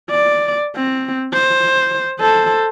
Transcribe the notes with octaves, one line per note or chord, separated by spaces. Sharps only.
D5
C4
C5
A4 C5